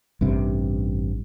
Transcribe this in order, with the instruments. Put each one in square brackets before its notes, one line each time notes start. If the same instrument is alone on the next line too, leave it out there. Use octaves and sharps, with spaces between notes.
[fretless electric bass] A1 G2 C3